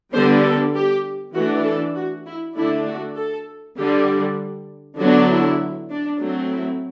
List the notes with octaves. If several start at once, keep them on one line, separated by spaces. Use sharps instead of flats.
D3 G3 B3 D4 C5
A4
G4
E3 A3 D4 F#4
A4
F#4
E4
D3 A3 D4 E4
F#4
A4
D3 G3 D4 G4
D3 F#3 B3 D4 F#4
E4
D4
F#3 A3 C4
E4